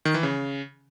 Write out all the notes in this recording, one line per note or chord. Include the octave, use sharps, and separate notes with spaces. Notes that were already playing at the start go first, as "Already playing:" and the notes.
D#3
E3
C#3